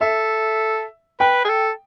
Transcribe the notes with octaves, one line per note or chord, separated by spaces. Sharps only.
A4 E5
B4 G5
G#4
A4